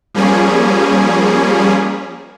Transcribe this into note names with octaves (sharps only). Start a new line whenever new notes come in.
F3 G3 A#3 C#4 G#4